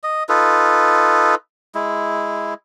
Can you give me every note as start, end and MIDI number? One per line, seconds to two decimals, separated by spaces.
0.03 0.23 75
0.29 1.35 63
0.29 1.35 65
0.29 1.35 69
0.29 1.35 71
1.75 2.54 56
1.75 2.54 64